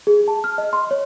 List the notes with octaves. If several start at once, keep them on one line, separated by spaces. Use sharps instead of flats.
G#4
A5
F6
D#5
C6
C#5